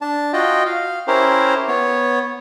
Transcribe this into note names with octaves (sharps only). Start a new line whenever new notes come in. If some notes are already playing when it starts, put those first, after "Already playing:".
D4 A5
F4 F#4 D#5 G5
F5
C#4 E4 G4 A#4 C5
B3 C#5